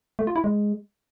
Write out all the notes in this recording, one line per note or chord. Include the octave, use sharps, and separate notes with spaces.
A3
F4
E4
G#3